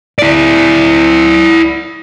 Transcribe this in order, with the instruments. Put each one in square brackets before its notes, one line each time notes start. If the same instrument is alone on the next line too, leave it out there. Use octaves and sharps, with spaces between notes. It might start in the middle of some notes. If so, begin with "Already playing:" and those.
[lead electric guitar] E4 D5